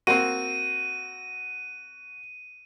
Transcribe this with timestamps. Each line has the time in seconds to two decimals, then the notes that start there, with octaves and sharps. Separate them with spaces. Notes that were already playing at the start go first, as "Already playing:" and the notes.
0.07 A#3 C4 F#4 D#7